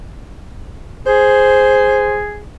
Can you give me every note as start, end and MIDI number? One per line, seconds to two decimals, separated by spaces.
1.07 2.43 68
1.07 2.20 72